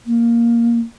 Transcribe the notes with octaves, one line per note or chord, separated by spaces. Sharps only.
A#3